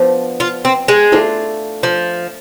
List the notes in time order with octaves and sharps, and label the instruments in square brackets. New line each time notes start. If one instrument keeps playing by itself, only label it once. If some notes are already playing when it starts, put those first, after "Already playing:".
Already playing: [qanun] F3 B3 D4
[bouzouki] F4
C4
G#3
[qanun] A3 D4 F4
[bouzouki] F3